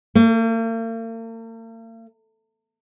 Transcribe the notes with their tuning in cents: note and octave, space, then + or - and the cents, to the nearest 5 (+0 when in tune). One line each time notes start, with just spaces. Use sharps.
A#3 -45